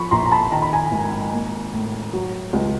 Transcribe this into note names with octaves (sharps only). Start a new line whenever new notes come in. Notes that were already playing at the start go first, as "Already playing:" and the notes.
Already playing: F3 B5 C#6
A#1 A#5 C6
A#5
A5 B5
D#3 A#5
B5
G#5 A#5
G#1
A#3
A2
F#3
C#2